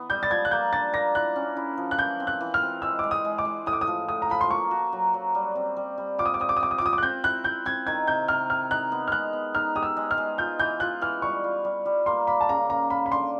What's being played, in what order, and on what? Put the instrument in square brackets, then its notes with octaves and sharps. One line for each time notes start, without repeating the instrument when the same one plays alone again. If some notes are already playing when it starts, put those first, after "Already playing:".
Already playing: [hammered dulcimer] E3 B3
[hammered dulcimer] G3 [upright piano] G6
[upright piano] A6
[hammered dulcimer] F3 [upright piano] G#6
[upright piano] F#6
[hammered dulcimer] A#3 [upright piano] G6
[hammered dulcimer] D4 [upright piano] A6
[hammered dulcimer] A#3 [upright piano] A#6
[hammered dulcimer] E4 [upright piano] F#6
[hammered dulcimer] C#4
E4
F3
[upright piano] F#6
[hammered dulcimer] E3 [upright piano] G6
[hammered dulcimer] C4
[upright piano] F#6
[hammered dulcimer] E3
[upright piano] F6
[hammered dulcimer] C4
[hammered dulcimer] G#3 [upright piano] E6
[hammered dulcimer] G#3 [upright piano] D6
[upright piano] D#6
[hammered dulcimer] G#3
[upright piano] D6
[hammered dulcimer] G#3
[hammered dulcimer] A2 [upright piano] D#6
[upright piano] D6
D#6
[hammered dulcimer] F3
[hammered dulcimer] A2 [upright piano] D#6
[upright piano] A#5
[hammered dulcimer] F3 [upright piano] B5
[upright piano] C6
[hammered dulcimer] A#3 [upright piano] C#6
[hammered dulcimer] F#4
F#3
F#3
G3
C4
G3
G3
[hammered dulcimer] F4 [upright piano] D6
[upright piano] D#6
D6
[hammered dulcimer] C4 [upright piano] D#6
[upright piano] D6
D#6
[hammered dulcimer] C4 [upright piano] D6
[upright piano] D#6
D6
[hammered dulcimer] F4 [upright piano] D#6
[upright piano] D6
F#6
[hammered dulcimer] C4 [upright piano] G6
[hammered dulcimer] E4 [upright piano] F#6
[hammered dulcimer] E4 [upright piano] G6
[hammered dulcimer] C4 [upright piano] G#6
[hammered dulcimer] D#3 [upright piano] G#6
[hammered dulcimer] C3 [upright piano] G6
[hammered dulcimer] C3 [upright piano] F6
[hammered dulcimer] C3 [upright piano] F6
[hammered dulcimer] D#4 [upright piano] F#6
[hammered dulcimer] B3
[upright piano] F6
[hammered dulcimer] G#3 [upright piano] F#6
[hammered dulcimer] B3
[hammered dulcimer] D#4 [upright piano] F6
[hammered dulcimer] G4 [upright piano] D#6
[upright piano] E6
[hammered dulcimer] G#3
[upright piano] F6
[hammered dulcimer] G#3
[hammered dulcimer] F4 [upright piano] G6
[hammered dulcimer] E3 [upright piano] G6
[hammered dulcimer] F4 [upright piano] F#6
[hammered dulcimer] E3 [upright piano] F6
[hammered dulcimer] G3 [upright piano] C#6
[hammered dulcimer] F4
G3
G3
[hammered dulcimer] A#3 [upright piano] C6
[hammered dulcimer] A#3 [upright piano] B5
[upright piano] A5
[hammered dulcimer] C#3 [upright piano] A#5
[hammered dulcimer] A#3 [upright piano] A#5
[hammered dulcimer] A#3 [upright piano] B5
[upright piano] B5
[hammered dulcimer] D3 [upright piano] C6